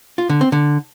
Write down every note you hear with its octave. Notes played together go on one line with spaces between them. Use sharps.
F4
D3
C4
D3